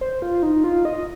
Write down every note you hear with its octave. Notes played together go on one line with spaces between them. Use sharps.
C5
F4
D#4
F4
D#5